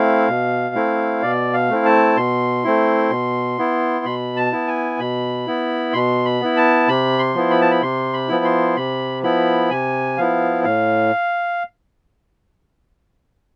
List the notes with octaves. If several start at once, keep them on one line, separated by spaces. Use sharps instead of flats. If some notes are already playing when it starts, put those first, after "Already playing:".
Already playing: A3 C4 E4 F5
B2
A3 C4 E4
B2 D5
F5
A3 C4 E4
A5
B2 C6
A3 C4 E4
B2
B3 E4
B2 B5
A5
B3 E4
G#5
B2 B5
B3 E4
B2 C6
B5
B3 E4
A5
C3 B5
C6
F3 B3 E4
B5
A5
B5
C3 C6
B5
F3 B3 E4
C6
C3 B5
F3 B3 E4 B5
C3 G#5
F3 B3 E4 F5
A2 F5